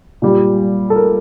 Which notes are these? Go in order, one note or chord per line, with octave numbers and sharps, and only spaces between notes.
A#2 G3
A4
A#4